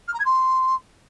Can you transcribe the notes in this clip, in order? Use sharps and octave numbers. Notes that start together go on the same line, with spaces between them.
F6
A#5
G#6
C6